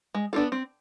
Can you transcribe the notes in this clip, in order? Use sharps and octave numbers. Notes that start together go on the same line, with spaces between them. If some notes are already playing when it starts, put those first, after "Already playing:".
G#3
B3 D4 F4 A4
C4